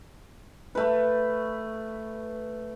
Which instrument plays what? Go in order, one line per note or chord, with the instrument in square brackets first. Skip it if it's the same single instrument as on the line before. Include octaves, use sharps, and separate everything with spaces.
[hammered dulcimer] A3 B4